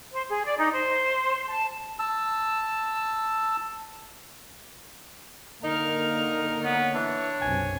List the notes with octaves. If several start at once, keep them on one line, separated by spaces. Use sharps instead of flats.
C5
G#4
D5
D#4
C5
A5
A5 E6
D3 A#3 D#4 A#4 F6
B3 C#5
E3 D4
B1 F#2 C3 G#5